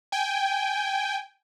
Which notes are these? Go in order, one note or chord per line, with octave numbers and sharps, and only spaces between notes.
G5 G#5